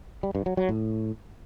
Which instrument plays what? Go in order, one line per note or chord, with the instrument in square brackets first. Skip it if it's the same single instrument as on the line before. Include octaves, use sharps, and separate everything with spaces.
[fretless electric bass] G3
G2
F#3
F#3
A2